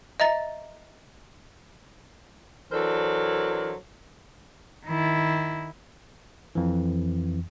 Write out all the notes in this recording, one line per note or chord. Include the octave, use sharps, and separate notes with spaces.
D#5 E5 A#5 A6
E3 F#3 D4 A4 A#4 C5
D#3 E4
F2 E3